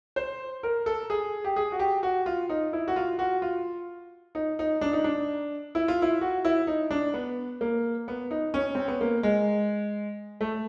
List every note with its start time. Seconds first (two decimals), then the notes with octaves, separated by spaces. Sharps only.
0.16 C5
0.63 A#4
0.86 A4
1.10 G#4
1.44 G4
1.56 G#4
1.72 F#4
1.80 G4
2.03 F#4
2.26 F4
2.49 D#4
2.73 E4
2.88 F#4
2.96 F4
3.19 F#4
3.42 F4
4.35 D#4
4.59 D#4
4.81 D4
4.93 D#4
5.04 D4
5.75 E4
5.88 F4
6.02 E4
6.21 F#4
6.45 E4
6.67 D#4
6.91 D4
7.14 B3
7.61 A#3
8.08 B3
8.31 D#4
8.54 C#4
8.75 C4
8.88 B3
9.01 A#3
9.23 G#3
10.41 A3